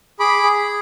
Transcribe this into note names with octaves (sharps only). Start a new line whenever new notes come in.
G#4 B5 D6
G#4